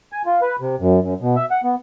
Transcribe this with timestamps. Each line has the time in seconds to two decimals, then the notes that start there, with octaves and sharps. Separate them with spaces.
0.13 G#5
0.26 F4
0.42 B4
0.60 C3
0.80 F#2
1.03 F#2
1.21 B2
1.36 E5
1.51 F#5
1.64 B3